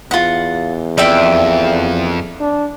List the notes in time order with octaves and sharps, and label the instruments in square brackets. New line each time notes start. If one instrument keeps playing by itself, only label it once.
[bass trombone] E2 [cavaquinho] F4 F#5
[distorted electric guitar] F2 [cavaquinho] D5 E5 G5
[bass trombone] D4